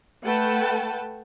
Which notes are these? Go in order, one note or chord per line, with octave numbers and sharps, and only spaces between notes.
A3 B4 F#5 G5 A5